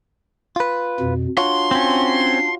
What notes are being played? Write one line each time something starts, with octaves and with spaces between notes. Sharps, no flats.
F4 B4
F2 B2
D4 F4 F#4 C#5 C6
C4 C#4